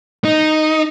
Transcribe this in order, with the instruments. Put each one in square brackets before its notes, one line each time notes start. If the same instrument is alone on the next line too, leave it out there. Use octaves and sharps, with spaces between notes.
[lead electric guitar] D#4